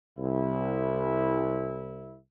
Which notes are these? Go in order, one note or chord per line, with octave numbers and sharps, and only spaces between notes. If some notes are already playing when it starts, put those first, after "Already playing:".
C2 E4